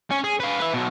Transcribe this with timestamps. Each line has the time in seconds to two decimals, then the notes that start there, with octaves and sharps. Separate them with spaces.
0.10 C#4
0.24 G#4
0.40 B4 F5
0.59 B4 E5
0.74 B2 F#3